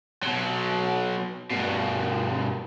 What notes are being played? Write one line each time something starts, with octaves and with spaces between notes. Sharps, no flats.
B2 F#3
G2 B2